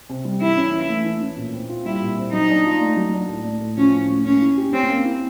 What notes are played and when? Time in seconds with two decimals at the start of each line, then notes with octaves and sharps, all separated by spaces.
0.10 C3
0.25 G3
0.41 E3 E4
0.57 C#4
0.73 E3
0.90 A3
1.05 E3
1.21 C#4
1.37 A#2
1.53 C4
1.69 F4
1.86 G3 E4
2.01 A#2
2.17 C4
2.33 F#3 D#4
2.50 D4
2.66 F4
2.81 A3
2.97 F#3
3.13 D4
3.29 A2
3.45 A3
3.61 A2
3.77 F3 C#4
3.93 A2
4.09 A3
4.25 A#3 C#4
4.41 E4
4.58 G4
4.73 C4 C#4
4.90 A#3
5.05 E4